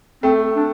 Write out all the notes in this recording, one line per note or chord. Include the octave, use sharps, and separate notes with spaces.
A3 C4
D4